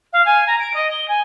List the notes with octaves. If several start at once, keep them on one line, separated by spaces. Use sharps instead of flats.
F5
G#5
A#5
D7
D#5
G7
G#5